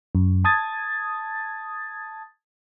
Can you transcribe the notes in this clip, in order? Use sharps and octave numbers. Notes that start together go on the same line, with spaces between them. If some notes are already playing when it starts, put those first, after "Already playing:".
F#2
A5 D#6 G#6 A6